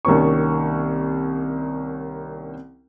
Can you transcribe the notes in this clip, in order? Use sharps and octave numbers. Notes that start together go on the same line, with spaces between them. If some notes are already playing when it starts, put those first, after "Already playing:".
C2 D#3 A#3 C#4 C#6